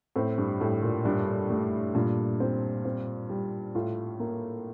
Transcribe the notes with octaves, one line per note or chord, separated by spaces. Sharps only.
A2 C4
G2
A2 G3
A#2
G2 D4
G2 A3
G2 A#2
C4
C4
G3
A2 F4
A#3